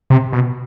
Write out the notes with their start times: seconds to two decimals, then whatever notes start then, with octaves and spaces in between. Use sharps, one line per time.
0.10 C3
0.32 B2